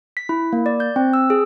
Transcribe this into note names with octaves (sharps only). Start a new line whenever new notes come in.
B6
E4
A#3
D5
G6
C4
E6
G#4